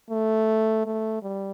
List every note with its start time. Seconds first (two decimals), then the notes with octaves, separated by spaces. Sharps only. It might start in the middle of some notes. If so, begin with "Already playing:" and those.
0.10 A3
0.86 A3
1.23 G3